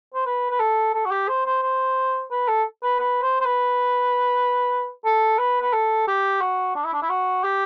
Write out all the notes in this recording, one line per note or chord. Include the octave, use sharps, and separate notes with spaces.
C5
B4
B4
A4
A4
F#4
G4
C5
C5
C5
B4
A4
B4
B4
C5
C5
B4
A4
B4
B4
A4
G4
F#4
D4
E4
D4
E4
F#4
G4